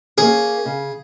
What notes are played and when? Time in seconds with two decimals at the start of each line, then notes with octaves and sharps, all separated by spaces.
0.18 A#3 C#4 G#4
0.66 C#3